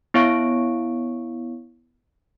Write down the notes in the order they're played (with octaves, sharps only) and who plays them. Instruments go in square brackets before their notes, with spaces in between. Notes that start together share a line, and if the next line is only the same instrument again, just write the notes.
[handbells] B3 E4 C#5 F5 C#6 D7